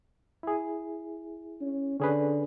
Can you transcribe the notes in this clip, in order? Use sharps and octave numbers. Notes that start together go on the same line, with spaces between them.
E4 G#4
C#4
D3 C#4 G#4 B4